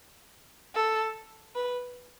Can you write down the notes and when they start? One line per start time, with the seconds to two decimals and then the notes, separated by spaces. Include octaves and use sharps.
0.75 A4
1.55 B4